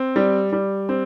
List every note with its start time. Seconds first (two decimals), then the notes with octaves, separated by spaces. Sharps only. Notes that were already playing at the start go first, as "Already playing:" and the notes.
Already playing: C4
0.16 G3
0.52 G3
0.89 C4